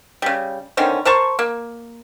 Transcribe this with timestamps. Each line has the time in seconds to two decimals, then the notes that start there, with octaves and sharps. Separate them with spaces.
0.22 C#3 G3
0.77 D3 D#3 C4 C#4
1.05 A#4 C5 A5 C#6
1.39 A#3